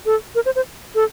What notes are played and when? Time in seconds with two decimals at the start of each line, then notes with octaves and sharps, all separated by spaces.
0.06 A4
0.35 A#4
0.45 C5
0.56 C5
0.95 A4